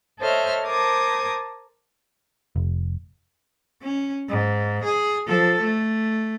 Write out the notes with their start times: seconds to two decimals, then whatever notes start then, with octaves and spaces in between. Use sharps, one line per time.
0.20 A4 C5 C#5 D#5 E5 F6
0.66 A#4 C5 A5 D6 D#6 G#6
2.56 F1
3.82 C#4
4.29 G#2
4.84 G#4
5.27 F3 A4
5.61 A3